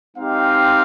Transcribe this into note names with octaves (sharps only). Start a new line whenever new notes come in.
G#3 C4 D#4 G4 F5